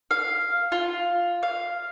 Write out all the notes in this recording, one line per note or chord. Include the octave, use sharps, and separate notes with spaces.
F5
F4
F5